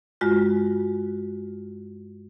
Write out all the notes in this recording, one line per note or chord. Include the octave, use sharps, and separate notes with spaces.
G2 G#3 F4 F#4